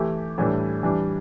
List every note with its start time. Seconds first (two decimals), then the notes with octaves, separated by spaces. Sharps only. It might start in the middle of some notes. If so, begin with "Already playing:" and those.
Already playing: E3 A3 E4 G4
0.38 A2 E3 G3 D4 A4
0.83 E3 G3 D4